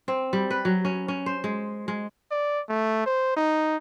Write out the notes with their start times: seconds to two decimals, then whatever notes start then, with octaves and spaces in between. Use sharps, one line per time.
0.08 C4
0.33 G3
0.50 B4
0.65 F#3
0.85 C#4
1.08 C#4
1.26 C5
1.44 G#3
1.88 G#3
2.31 D5
2.69 A3
3.06 C5
3.37 D#4